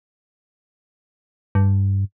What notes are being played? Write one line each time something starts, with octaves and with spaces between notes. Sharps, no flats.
G2